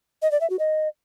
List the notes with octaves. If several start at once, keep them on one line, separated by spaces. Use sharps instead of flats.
D#5
D5
E5
F#4
D#5